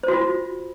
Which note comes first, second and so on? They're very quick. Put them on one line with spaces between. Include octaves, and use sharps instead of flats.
C5 F#4 F4